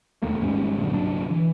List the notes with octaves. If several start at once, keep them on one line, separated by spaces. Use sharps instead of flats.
E1 D#2 A3 A#3
G#1 G#2 G3 C#4
F#2 A#2 D3
G1 C2 F#3 D4
E3